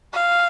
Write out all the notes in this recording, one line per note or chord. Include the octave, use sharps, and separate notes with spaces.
F5